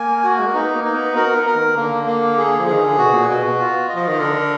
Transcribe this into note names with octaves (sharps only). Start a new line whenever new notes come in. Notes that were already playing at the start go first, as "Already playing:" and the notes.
Already playing: A#3 G#5
F#4
G#3
A#3
B3 D#4
A#3
D#4
B3
F#4 A#4
B3
A#4
D#3
D3 A#3
A#3
G#4
F3
G#4
D#3
D3
B2 F#4
A#2
B2 F#4
B2
F4
D#5
F3
D#3
D3 A#4